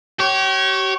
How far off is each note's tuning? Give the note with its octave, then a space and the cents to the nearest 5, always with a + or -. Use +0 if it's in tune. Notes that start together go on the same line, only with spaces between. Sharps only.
G4 -40 C#5 -10